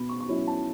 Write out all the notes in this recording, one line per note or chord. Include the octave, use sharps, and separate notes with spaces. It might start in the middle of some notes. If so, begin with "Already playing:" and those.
Already playing: B2 B5
C#6
C#6
F#3 C#4 E4 B5
A5